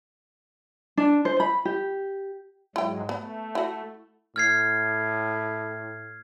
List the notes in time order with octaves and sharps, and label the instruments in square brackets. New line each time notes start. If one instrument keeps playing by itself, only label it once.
[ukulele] D4
C5
B5
G4
[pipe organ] G#2 F#3 G#3 [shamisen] E4 G5
[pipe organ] A3 [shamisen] B3
[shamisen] E4 F#4
[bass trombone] A2 [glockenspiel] F6 G#6 C7